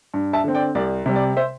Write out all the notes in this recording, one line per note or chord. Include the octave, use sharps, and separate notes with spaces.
G2
E5 A5
D3 C4
D5 G5
C2 D5
C3 G3
D5
C5 E5